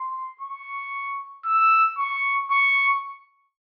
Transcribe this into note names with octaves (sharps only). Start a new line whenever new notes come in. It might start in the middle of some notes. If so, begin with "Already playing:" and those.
Already playing: C6
C#6
E6
C#6
C#6